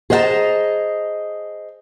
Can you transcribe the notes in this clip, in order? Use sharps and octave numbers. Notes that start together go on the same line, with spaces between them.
G#4 C5 D#5 E5 A5 A#5